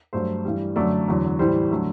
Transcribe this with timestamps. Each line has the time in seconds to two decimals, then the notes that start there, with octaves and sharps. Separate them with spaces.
0.13 G2 F#3 A3 C5
0.45 G2 E3 G3
0.76 F#2 D3 F#3 A3 D5
1.08 E2 D3 F#3
1.39 A2 E3 G3 C5
1.71 D3 F#3 A3